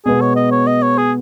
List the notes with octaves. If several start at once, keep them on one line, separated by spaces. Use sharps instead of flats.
B2 G#3 B3 G#4
C#5
D#5
C#5
D#5
C#5
G#4